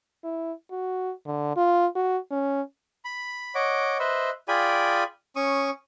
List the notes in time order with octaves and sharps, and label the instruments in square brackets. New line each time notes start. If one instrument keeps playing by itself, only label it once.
[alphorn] E4
F#4
D3
F4
F#4
C#4
[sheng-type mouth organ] B5
C#5 D#5 F#5 D6
B4 C5 D#5 E5
F4 G#4 D5 G5 G#5 B5
C#4 C#6 D#6